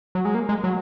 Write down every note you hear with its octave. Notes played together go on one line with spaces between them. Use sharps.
F#3
G#3
A#3
G#3
F#3